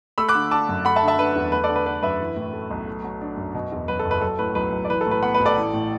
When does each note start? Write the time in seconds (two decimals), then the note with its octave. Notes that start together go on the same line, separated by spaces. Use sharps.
0.18 A3 B5 E6
0.29 D6 F#6
0.35 D3
0.51 D4 A5 D6
0.69 F#2
0.85 A3 F#5 B5
0.96 E5 A5
1.03 D3
1.08 E5 A5
1.19 D4 B4
1.36 E2
1.52 A3 B4
1.64 A4 D5
1.69 D3
1.76 B4
1.86 D4 B4
2.03 F#2 B4 E5
2.20 E3
2.36 A2
2.53 A3
2.71 B1
2.87 A3
3.04 F#3
3.21 D4
3.37 F#2
3.54 B2
3.72 E2
3.88 F#3 B4
3.99 A4
4.05 F#1
4.11 B4
4.21 F#3 A4
4.39 A2 B4
4.55 B1 B4
4.72 B1
4.85 D5
4.89 E3 B4
5.01 A4
5.06 A2
5.11 B4
5.23 B3 F#5 B5
5.34 B4
5.40 A1
5.45 A4 D5
5.57 E3
5.73 A2